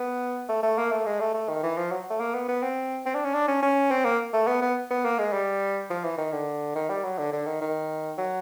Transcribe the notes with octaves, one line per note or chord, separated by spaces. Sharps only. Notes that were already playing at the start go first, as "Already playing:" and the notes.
Already playing: B3
A3
A3
A#3
A3
G#3
A3
A3
D#3
E3
F3
F#3
A3
A#3
B3
B3
C4
C4
D4
C#4
D4
C#4
C#4
C4
A#3
A3
B3
B3
B3
A#3
G#3
G3
F3
E3
D#3
D3
D#3
G3
F#3
D3
D3
D#3
D#3
F#3